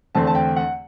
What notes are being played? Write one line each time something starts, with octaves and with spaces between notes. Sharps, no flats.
E2 D3 A3 C4 A5
A5
G5
F#5